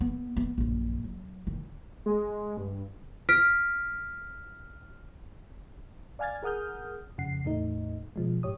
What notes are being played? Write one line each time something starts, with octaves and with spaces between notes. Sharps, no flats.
B3
B3
A#1 F#2
F#3
D#3 E3
G#3
G2
F6 B6 D7
D5 F5 G#5 F6 G#6 A6
G#4 A#4 F#5 D#6 F6 G6
F2 C#3 F#5 C7
E2 A2 A3 D#4
B2 F3 G#3
G#2 G4 C#5 D#6